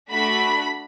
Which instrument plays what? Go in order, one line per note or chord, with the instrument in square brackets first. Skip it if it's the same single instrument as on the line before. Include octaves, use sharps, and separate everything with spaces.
[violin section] A3 D4 F#4 B5